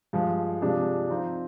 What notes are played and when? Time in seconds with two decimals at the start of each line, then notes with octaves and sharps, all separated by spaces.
0.13 G2 F3 G#3
0.62 C3 F3 G#3 D4
1.10 F3 C4 D#4